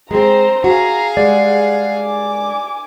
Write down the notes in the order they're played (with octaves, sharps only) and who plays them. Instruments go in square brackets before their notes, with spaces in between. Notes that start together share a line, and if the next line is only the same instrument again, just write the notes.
[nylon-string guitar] G#3 G#4 [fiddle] C4 [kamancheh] C5 A#5
[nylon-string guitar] F#4 [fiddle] G#4 F5 [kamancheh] A#5
[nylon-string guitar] G3 G#3 [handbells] D5 [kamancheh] F#5
[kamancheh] G#5 D6